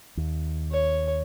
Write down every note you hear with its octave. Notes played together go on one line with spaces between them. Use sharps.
D#2
C#5